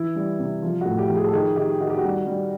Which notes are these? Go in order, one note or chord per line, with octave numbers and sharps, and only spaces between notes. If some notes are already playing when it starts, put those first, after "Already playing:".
Already playing: E3 E4
G3
C3
F3 F4
A2 F#4
G4
F3
G#4
A4
D#3 G#4
D#3 G4
D#3 F#4
G4
F#4
G3
G3